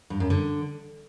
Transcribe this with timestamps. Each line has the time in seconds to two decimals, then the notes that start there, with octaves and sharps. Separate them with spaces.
0.10 G2
0.20 F#2
0.30 D3